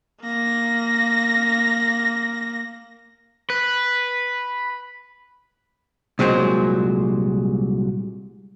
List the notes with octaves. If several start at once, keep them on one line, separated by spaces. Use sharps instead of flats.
A#3 A#6
B4
C2 A#2 F#3 G#3 C5